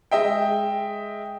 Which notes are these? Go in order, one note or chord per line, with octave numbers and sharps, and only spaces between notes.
G#3 D#5 E5 G5